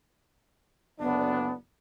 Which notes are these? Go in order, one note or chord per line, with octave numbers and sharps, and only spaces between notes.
F#1 D2 B3 D4